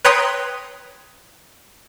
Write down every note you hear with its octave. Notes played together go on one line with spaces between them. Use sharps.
B4 C#5 G5 A#5 C6 D#6